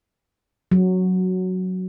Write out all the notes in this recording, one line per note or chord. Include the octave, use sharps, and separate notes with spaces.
F#3